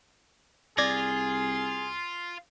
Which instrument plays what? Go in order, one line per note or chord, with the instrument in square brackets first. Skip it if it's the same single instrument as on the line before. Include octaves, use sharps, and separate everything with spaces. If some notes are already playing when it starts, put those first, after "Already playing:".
[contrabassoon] C2 [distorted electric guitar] F4 [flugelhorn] G#4 [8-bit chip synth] D5 G#6 A#6